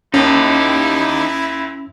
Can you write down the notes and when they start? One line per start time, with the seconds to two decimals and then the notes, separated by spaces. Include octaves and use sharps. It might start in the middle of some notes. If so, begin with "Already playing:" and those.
0.14 D#2 C#4 D#4 E4 G4